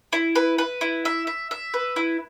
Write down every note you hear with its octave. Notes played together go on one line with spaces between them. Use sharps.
E4
B4
B4
E4
E5
E5
E5
B4
E4